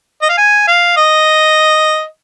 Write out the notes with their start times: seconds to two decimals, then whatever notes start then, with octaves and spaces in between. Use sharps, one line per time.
0.22 D#5
0.29 F5
0.38 G#5
0.67 F5
0.97 D#5